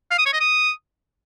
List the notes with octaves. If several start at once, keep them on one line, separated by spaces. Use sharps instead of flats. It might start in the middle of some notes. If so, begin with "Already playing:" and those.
F5
D#6
C#5
D#5
D#6